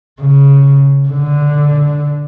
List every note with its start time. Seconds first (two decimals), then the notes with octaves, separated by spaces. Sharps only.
0.20 C#3
1.09 D3